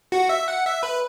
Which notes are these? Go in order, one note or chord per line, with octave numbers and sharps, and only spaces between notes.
F#4
E5
F#5
E5
B4